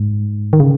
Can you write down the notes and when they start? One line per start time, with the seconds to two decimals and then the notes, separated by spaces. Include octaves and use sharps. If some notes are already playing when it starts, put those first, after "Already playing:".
Already playing: G#2
0.53 D#3
0.60 C#3